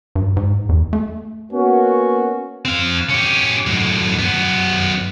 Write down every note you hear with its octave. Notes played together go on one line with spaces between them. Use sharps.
G2
G#2
E2
A3
A#3 B3 C#4 F#4
C4 F5
C#4 G4
F#2 A2
F#2 B3